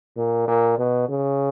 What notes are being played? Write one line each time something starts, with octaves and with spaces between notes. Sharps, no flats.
A#2
A#2
B2
C#3